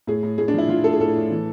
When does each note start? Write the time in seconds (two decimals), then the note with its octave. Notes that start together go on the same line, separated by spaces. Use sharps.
0.07 A2 G#4
0.23 A2
0.38 A2 G#4
0.48 D4
0.54 F3 E4
0.69 F3 F4
0.84 A2 A4
0.93 G#4
0.99 A2 A4
1.16 A2
1.31 E3